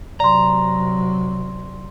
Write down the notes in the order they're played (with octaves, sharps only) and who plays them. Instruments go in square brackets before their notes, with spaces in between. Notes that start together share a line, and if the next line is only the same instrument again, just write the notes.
[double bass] C3 F#3 [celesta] D5 C6 [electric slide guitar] A#5